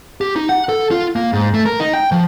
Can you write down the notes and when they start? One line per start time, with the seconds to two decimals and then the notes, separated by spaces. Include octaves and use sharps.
0.21 G4
0.36 D#4
0.49 F#5
0.69 A4
0.91 F4
1.16 A#3
1.33 G#2
1.54 A3
1.65 A#4
1.80 D#4
1.93 G5
2.12 F3